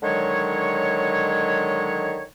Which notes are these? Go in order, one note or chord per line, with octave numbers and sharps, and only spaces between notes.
D3 D#3 F#3 G#3 C#5